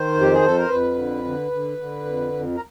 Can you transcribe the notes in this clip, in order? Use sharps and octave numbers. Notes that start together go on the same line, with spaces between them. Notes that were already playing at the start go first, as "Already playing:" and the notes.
Already playing: D#3 C5
F2
G4
G#4
F2 A4
A#4
F2 B4
D3
D3
D3
D3
F2
F2
A#4